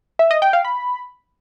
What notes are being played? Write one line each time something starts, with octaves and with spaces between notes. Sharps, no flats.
E5
D#5
G5
F5
B5